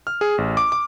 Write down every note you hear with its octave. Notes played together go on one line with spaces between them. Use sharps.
F6
G#4
A1
D6
D6